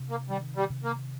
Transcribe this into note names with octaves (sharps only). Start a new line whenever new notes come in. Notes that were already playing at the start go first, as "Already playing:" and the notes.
Already playing: C3 D4
A#3
D#3 G3
G3
C3
A#3